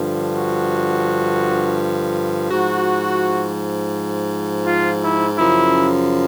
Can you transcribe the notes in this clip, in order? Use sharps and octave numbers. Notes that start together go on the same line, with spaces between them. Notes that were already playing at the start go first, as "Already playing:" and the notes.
Already playing: G2 D3 F3
F#4
G#2 F3 F#4
F4
E4
F#2 C#3 F3 E4